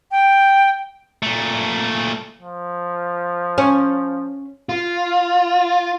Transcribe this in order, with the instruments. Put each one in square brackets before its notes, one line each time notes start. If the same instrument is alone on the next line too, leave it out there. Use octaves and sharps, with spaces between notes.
[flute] G5
[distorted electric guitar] A#2 A3
[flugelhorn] F3
[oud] C#4
[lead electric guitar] F4